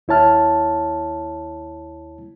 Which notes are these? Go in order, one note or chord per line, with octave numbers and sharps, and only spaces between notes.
D#2 E4 C#5 A5 F6